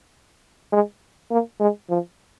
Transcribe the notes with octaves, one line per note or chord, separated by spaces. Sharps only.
G#3
A#3
G#3
F3